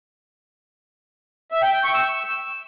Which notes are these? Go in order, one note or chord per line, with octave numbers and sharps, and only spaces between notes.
E5
G5
G5
C#6
E6